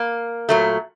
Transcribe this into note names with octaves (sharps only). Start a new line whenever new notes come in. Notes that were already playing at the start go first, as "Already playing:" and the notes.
Already playing: A#3
A#2 F#3 A3